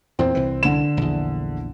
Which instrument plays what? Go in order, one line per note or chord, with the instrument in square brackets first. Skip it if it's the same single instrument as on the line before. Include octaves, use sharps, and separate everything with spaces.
[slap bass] E2 A#2 [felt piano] C4
[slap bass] C2 E3
[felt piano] D3 E7
[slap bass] A#1 E2